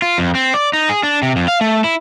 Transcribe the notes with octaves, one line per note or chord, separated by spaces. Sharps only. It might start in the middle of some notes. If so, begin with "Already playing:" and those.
F4
F2
C4
D5
D#4
G#4
D4
C3
F2
F5
A3
E4